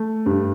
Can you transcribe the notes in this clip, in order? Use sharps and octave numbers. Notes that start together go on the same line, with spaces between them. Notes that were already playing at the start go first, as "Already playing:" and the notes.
Already playing: A3
G2